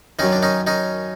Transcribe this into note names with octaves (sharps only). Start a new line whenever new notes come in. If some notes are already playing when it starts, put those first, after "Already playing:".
F#2 D#3 C#4 D#4
D4
C#4 D#4
C#4 D#4